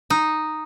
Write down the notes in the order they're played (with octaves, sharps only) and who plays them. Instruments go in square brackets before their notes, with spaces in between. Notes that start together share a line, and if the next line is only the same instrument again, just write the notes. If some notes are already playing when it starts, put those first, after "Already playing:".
[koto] D#4